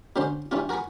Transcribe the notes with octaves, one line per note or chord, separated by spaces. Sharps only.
B2 D3 C#4 C5 C6
G2 E3 C#4 F4
F#4 A#4 G#5 B5 C#6